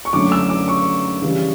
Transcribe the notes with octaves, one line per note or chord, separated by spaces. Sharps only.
C#6
F#2 D3 A3 D6
E6
D6
C#6
C#3 E3 G3